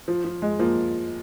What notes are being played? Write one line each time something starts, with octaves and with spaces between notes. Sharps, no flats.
F3
F3
G#3
F3 A#3